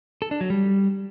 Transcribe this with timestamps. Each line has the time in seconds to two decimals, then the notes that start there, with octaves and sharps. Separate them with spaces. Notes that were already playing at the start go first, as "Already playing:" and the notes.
0.22 A4
0.31 D4
0.41 F#3
0.50 G3